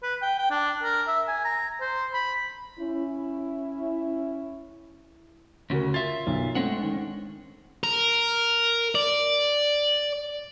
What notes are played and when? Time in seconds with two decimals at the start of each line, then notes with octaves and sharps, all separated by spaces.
0.03 B4
0.22 G5
0.39 G5
0.51 D4
0.83 A#4
1.08 E5
1.29 G#5
1.45 A#5
1.81 C5
2.14 B5
2.79 C#4 E4
5.70 D2 C#3 C#4 F#4 A#4
5.94 F4 E5 A6
6.27 B1
6.55 G#3 A3 C4 D4 F#5
6.79 D#3 C#4
7.84 A#4
8.95 D5